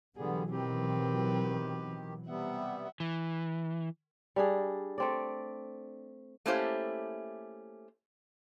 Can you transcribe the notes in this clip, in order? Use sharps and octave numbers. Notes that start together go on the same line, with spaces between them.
B2 D3 E3 F#3 G3 B3 G#4
D#3 C4 G4 B4
C3 G3 B3 E5 F#5
E3
G3 D4 G#4
A3 C4 D5
A3 A#3 C#4 E4 G4 C5